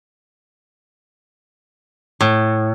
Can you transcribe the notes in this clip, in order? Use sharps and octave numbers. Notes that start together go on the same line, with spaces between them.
A2